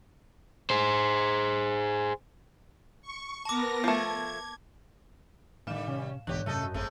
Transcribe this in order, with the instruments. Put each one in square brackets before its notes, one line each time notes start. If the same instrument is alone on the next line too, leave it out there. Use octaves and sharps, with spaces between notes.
[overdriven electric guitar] G#4 C5
[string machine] C#6
[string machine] B3 A#4 A#6 [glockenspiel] A5 D6
[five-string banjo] F3 A3 [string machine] G#6
[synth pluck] A2 F5 E7 [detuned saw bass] D3 [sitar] D#3 G3
[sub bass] C3 [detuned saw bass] C#4
[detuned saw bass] B1 [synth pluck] G#2 C#5 F#6 [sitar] D3 G4 [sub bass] E3
[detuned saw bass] F#2 [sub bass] C3 [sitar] A3 A4 D#5
[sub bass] G#1 [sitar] C3 G#3 A3